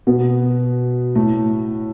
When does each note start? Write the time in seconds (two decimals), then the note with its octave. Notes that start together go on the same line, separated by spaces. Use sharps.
0.07 B2 B3
1.15 A2 A3